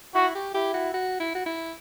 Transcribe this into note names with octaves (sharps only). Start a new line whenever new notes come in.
E4 F#4
G4
E4 G4
F#4
F#4
E4
F#4
E4